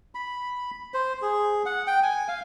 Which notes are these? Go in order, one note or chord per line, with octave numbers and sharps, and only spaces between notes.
B5
C5
G#4
F#5
G5
G#5
F5